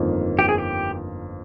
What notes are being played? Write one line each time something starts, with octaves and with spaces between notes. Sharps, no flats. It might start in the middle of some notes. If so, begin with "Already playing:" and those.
Already playing: G1 F2 D#3 A#3 F4
G4
G#4
G4